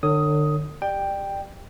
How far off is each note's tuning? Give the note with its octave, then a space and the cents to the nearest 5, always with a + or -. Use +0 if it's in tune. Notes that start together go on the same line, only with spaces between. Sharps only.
D3 +40 C#5 +0 D#6 +10
G4 +10 D5 +35 G5 +5